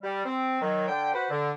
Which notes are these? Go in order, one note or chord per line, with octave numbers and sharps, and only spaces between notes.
G3
C4
D#3 F#3
D3 G5
F#4 B4 C5
D3